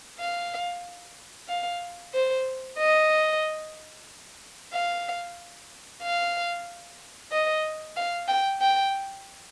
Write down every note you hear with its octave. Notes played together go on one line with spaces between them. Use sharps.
F5
F5
C5
D#5
F5
F5
D#5
F5
G5
G5